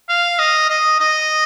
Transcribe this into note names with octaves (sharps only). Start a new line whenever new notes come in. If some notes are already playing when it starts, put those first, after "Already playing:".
F5
D#5
D#5
D#5